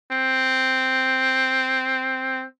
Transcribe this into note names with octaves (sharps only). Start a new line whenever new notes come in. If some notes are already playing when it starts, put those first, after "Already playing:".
C4